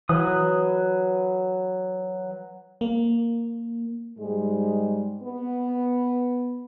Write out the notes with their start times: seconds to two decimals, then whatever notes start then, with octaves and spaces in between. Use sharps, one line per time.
0.09 E3 F#3 B4 D#6
2.81 A#3
4.18 G#2 G3 G#3
5.23 B3